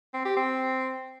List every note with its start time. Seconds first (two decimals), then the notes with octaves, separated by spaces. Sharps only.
0.14 C4
0.25 G4
0.37 C4